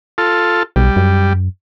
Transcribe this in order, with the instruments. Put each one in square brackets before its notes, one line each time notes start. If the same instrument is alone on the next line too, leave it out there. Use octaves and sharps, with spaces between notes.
[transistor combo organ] F4 A4
[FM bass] B1 [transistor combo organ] G3
[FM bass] F#2